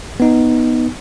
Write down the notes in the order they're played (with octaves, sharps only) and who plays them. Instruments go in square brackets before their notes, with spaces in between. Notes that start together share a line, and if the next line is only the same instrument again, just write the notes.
[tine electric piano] B3 D#4